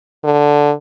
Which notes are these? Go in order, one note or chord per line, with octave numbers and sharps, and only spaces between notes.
D3